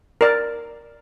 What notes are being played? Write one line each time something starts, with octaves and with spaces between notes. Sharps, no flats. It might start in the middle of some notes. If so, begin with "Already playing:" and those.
A#4 D5